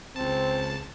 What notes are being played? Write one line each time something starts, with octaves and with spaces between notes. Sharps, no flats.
C#2 C4 A5